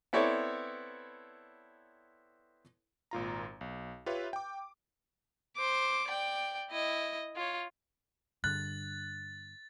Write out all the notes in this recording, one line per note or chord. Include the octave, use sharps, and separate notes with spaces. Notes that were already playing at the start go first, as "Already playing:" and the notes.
B3 C4 E4 A4 C#5 D5
G#1 A#2 F4 A#5
B1
F4 G4 B4 C#5 E5
G5 D6
C5 D6
D5 G5
E4 D#5
F4 C#5
G2 D3 F#6 A6